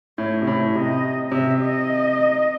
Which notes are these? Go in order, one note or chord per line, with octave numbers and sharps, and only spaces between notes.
A2 C#5
C3
A2 C#5
C3 D#5
C3 E5
D#5